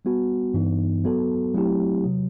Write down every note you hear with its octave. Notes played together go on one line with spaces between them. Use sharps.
G3 B3 F#4
G2 E3 B3 D#4
F#3 B3 F#4 A4
F#3 A3 C4 E4 G4
C3 F#3